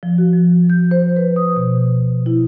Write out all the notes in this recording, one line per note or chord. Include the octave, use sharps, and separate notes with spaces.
F3
F#4
F3
G6
C5
B4
D#6
B2
E4